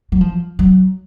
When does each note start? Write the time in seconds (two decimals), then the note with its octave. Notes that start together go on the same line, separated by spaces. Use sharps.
0.12 F#3
0.21 F3
0.59 F#3